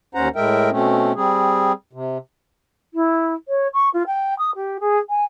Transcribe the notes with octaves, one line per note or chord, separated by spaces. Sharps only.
D#2 C#4 C5 F#5 A#5
A2 G#3 A#4 E5 G5
B2 A3 C4 C#4
G3 C4 G#4
C3
E4
C#5
C#6
F4
G5
D#6
G4
G#4
G#5